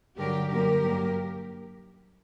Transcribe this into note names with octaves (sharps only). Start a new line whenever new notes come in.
G2 D3 F#3 G4 A#4
F#2 D3 F#3 A#3 G4 A#4
G2 F#3 A#3